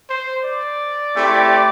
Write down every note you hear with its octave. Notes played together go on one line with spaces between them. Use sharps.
C5
D5
A3 C4 E4 G4